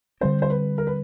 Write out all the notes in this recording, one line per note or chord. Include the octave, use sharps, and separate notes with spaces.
D3 G3 C4 C5
C5
B4
A#4
B4